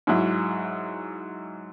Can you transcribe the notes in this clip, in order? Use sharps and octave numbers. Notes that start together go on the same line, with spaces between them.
G#2 F#3 E4